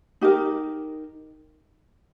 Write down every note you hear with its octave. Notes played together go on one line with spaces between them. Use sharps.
D#4 G4 A#4